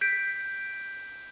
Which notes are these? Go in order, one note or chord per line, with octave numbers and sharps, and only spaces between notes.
G6 B6 D7